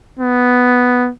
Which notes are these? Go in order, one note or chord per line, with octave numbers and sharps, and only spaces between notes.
B3